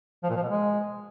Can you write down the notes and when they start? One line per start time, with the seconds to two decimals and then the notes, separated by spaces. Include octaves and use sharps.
0.23 F3
0.30 A#2
0.36 F3
0.42 B2
0.49 G#3